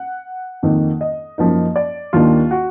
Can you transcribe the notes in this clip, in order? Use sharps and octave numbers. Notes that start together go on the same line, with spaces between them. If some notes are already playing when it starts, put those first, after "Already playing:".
Already playing: F#5
F2 D#3 A#3 D#4
D#5
F#2 F3 A#3 D#4
D5
D#2 D#3 A#3 D4 F4
F#4